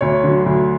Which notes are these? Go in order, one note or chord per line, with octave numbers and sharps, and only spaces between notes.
D2 C#5
D3 F#3
D2